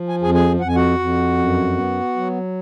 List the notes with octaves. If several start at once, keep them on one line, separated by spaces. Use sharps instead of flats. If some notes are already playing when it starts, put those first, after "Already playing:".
Already playing: F3
G#5
F2 G#4 G#5
G#4 G#5
F2 F#5
G#5
F#4 F#5
F2
F#2
B3
F#3